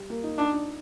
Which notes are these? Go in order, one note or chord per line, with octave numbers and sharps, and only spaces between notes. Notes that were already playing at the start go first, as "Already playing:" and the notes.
Already playing: G3
A#3
D#4
D4 D#4
D4